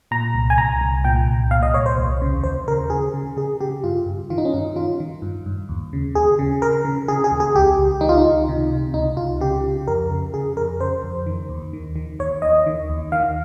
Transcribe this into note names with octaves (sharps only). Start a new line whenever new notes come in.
A#2 A#5
C2
G#5
C2 A#5
C2
A#2 G5
C2
A#2 F5
D#5
C2 C#5
C5
D#2
C#3
D#2 C5
C#3 A#4
C#3 G#4
C#3
C#3 G#4
C#3 G4
G2 F4
G2
D#3 F4
D#4
C#4
G2 D#4
D#3 F4
D#3
G2
G2
D#2
C#3
D#2 G#4
C#3
C#3 A#4
C#3
C#3 G#4
G#4
D#2
G#4
C#2 G4
C#2
D#3 D#4
F4
D#4
C#2
C3
C3
C#2 D#4
C#2 F4
C#3 G4
C#3
F2 A#4
C#3
C#3 G#4
F2 A#4
C#3 C5
F2
D#3
D#2
D#3
D#3
D#2 C#5
D#2 D#5
D#3
D#2
D#3 F5